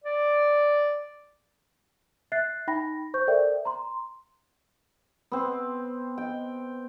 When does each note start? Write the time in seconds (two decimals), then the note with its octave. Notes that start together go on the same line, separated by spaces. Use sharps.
0.04 D5
2.32 E5 F#6 A6 C7
2.68 D#4 G5 B5 A#6
3.14 C5 C#6 G6
3.28 A4 A#4 C5 D5 E5 G5
3.65 A#5 C6
5.32 B3 C4
6.18 G5